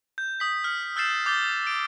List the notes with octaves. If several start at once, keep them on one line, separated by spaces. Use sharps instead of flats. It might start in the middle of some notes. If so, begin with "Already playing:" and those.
G6
D#6 B6
F6
E6 F6 G6 A6 C7 E7
D6 G6 A6 G7
D7